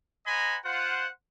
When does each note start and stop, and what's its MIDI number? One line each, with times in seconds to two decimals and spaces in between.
0.26 0.56 72
0.26 0.56 75
0.26 0.56 78
0.26 0.56 80
0.26 0.56 82
0.26 0.56 83
0.65 1.07 65
0.65 1.07 72
0.65 1.07 78